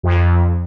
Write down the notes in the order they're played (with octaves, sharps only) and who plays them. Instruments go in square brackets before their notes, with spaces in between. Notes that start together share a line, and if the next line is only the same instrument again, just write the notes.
[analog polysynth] F2